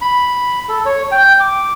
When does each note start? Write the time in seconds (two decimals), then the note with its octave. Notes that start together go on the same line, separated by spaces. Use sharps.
0.01 B5
0.69 A4
0.86 C#5
1.12 G5
1.40 D6